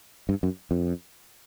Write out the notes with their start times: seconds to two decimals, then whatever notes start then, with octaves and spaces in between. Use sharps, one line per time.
0.29 G2
0.43 F#2
0.71 F2